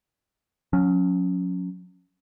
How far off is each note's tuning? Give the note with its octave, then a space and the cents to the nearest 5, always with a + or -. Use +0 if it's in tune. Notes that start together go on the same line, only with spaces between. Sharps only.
F#3 -35 C#4 +0